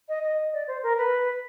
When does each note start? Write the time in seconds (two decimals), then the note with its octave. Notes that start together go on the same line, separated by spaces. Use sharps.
0.09 D#5
0.23 D#5
0.53 D5
0.67 C5
0.83 A#4
0.98 B4